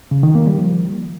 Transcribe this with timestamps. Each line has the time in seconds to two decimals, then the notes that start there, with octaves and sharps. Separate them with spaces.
0.11 C#3
0.23 D#3
0.35 A#3
0.47 G3
0.59 F3